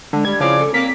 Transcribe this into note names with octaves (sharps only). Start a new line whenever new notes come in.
D3 G#3
G3 G#6
C#3 F3 C4 E4 D5
A4
A#3 C4 B6